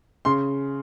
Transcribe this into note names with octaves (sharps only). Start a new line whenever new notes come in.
C#3 C6